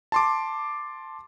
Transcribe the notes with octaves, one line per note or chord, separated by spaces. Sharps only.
A5 C6 D6